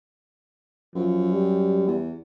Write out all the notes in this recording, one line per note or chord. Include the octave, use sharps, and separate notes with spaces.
F#2 F3
G3
E2